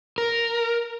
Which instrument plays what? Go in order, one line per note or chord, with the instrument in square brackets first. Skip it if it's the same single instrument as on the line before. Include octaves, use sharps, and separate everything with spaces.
[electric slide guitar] A#4